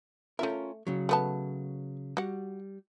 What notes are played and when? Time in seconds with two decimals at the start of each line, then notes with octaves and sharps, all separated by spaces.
0.39 A3 C#4 F4 A#4 E5
0.87 C#3 F#3
1.09 A3 B3 A5
2.17 G3 F#4 F#5